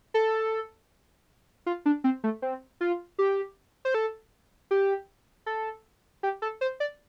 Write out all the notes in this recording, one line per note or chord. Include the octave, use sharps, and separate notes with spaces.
A4
F4
D4
C4
A3
C4
F4
G4
C5
A4
G4
A4
G4
A4
C5
D5